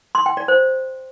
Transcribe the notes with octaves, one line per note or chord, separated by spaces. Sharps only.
C6
G5
D5
C5